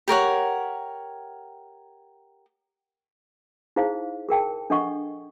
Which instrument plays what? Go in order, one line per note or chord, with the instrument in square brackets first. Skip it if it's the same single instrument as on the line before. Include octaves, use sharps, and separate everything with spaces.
[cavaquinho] G4 A#4 C#5 F#5
[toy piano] D#4 E4 G#4 C5 F5
G#4 A#4 G5 A5
D4 A4 D#5 F#5 C#6